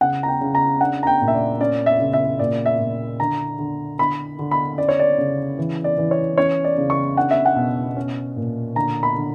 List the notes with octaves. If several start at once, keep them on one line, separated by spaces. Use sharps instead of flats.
C#3 F#5
A#5
G5
C#3
A#5
D4 F#5
A#5
G5
A#2
E5
D5
C#4 D5
E5
C#3
E5
A#2 D5
E5
A#2
D3 A#5
D3
D3 B5
D3
B5
C#4 D5
C#5
D5
C#3
E3
D5
E3
C#5
C#4 C#5
D5
C#3
C#6
D4 F#5
E5
F#5
B2
C#4
A#2
D3 A#5
B5
D3